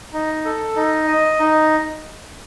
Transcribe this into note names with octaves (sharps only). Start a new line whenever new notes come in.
D#4
A4
D#4
D#5
D#4